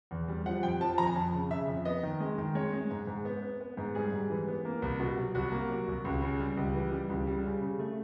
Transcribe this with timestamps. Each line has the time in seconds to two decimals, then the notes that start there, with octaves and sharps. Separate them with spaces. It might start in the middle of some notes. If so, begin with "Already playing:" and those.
0.11 E2
0.28 G3
0.46 F3 F#5
0.63 F2 G5
0.81 F3 A5
0.98 F2 A#5
1.07 G#5
1.16 F2 A5
1.33 C#3
1.50 C#3 E5
1.68 F2
1.85 B3 D#5
2.03 D#3
2.20 G#3
2.38 D#3
2.55 G#3 C#5
2.73 G#3
2.90 G#2
3.07 G#2
3.25 B3
3.42 B3
3.60 B3
3.77 G#2
3.95 G3 G#4
4.12 G#2
4.30 E3
4.47 B3
4.65 A#3
4.82 C2
5.00 B2
5.17 F#3
5.35 C2 F#4
5.52 A#3
5.70 F#3
5.87 C2
6.05 C#2
6.22 C#3
6.40 G3
6.57 C#2
6.74 E3
6.92 G3
7.09 C#2
7.27 G3
7.44 C#3
7.62 C#3
7.79 A3